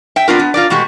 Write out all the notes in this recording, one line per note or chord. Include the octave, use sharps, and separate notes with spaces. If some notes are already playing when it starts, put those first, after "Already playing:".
E5 G5
B3 D4 F4 A#4
B3
F4 A#4 D5
B2 G#3 A3 F#4 G4